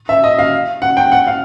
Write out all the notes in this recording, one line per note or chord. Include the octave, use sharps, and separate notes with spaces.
E5
D#5
F5
F#5
G5
F#5
F5